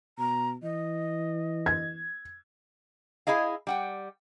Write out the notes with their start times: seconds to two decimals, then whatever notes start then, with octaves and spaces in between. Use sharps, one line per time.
0.19 B2 A#5
0.63 E3 D#5
1.66 G#6
3.27 E4 G#4 D#5 F5
3.67 G3 F#5 G5